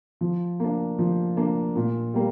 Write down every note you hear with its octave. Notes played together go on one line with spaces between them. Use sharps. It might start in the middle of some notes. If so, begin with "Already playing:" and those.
F3
A#3 D4
F3
A#3 D4
A#2
G3 A#3